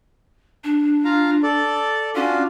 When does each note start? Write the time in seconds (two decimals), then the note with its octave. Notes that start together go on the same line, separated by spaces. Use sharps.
0.64 D4
1.05 F4 F5 A#5
1.43 A4 D5
2.15 C#4 D4 F4 F#4